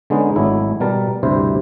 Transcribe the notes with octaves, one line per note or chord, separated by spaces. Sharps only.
D3 G#3 B3 C#4 D#4
G#1 F#3 A3 E4
B2 G3 A#4 A5
D2 G2 C3 E4 C5